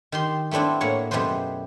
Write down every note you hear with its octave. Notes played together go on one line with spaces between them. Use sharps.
D#3 G4 C6
A3 B3 C4 D4 E4
A2 A#3 B4 C#5 F#5
F#2 B2 A3 G4 B4 C5